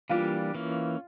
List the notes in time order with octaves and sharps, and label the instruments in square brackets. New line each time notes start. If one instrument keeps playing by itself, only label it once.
[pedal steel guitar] E3 G3 A#3 D4 G4 [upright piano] F4
[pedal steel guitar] E3 A#3 C#4